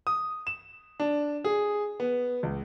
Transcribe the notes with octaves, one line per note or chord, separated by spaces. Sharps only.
D#6
E7
D4
G#4
B3
C#2